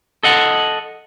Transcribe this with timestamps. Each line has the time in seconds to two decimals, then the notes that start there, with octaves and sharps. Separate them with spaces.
0.23 A4 D#5 F#5